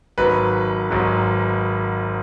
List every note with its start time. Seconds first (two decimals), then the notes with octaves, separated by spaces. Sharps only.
0.18 G#1 G#2 F#3 B4
0.90 G#1 G#2 F#3